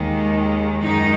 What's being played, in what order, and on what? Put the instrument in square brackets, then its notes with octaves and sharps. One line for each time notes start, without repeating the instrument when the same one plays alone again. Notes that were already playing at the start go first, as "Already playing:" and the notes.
Already playing: [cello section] D#2 D#3 G#3
F#2 D#3 G#3 D#4